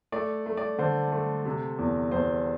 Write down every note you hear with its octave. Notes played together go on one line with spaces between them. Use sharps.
A3 D5
A3
D5
D3 C5
A3
C3
E2
E2 C5